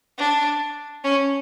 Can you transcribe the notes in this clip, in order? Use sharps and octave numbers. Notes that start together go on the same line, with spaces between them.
D4
C#4